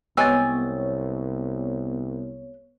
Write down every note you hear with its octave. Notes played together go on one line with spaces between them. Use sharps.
C2 G#3 B3 G4 C#5 G#5 E6 A6